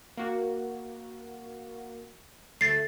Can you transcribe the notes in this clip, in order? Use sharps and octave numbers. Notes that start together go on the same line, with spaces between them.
A#3 F#4
D2 A3 A6 C7